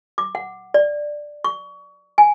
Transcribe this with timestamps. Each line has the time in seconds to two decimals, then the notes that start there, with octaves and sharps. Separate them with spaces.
0.18 D6
0.35 F#5
0.74 D5
1.44 C#6
2.18 G#5